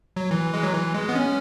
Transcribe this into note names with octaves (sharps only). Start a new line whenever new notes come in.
F#3
E3
G#3
F#3
E3
G#3
B3
C#4